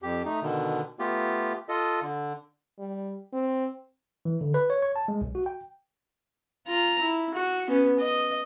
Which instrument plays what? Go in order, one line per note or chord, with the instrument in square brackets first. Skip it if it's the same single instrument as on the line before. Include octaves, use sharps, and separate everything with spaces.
[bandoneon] F2 G4
A3 D#4
B2 D3 D#3
A3 B3 F4 G4
F4 A4 D#5
D3
[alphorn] G3
C4
[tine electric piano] E3
D3
B4
C#5
C#5
A5
G#3
B1
F#4
G5
[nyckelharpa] F4 A#5
E4
F#4
B3 C#4
D#5